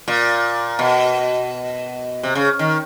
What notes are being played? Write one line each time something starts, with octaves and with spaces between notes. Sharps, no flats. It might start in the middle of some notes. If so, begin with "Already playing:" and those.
A#2
B2
C3
C#3
D#3